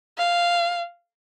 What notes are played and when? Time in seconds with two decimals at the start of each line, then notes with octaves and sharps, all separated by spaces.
0.18 F5